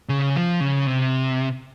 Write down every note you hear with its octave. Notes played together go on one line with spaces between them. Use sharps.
C#3
F3
C#3
C3